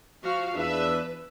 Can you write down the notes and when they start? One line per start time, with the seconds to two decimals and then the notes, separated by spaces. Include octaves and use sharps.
0.23 F3 F#4 F5
0.56 E2 D4 B4 E5